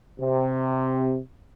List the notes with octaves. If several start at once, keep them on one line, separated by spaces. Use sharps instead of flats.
C3